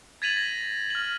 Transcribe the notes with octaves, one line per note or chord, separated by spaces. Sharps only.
G#6 A6 B6 D#7 F7 F#7
A#6
F6 F#7